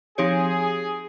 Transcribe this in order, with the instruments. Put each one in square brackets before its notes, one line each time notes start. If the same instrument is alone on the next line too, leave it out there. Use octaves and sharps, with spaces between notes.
[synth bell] F3 C4 D#4 G4 C#5 [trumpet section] G#4